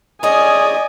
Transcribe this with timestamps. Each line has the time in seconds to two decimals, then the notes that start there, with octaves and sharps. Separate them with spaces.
0.23 C#4 G#4 D5 D#5 G#5 D#6